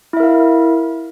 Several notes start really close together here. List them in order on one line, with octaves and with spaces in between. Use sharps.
E4 E5 A#4 F5